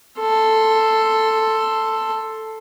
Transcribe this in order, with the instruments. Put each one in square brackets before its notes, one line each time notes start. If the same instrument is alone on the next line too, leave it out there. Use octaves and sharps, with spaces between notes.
[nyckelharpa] A4 C6